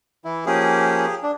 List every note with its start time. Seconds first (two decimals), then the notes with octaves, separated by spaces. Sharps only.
0.25 E3 E4
0.46 F3 A#3 C#4 G4 G#4
1.23 D4